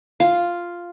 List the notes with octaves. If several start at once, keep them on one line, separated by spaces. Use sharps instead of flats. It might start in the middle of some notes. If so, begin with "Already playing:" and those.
F4 F5